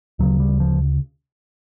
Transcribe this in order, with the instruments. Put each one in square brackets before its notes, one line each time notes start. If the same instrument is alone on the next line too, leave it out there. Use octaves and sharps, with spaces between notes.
[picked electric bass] D2 C#3 F#3
G3
F3